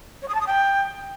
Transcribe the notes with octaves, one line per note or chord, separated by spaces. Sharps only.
C#5
D#6
A5
D#6
G5